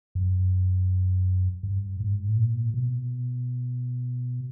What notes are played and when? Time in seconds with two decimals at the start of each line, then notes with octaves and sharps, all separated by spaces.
0.15 F#2
1.63 G2
2.00 G#2
2.28 A2
2.37 A#2
2.74 B2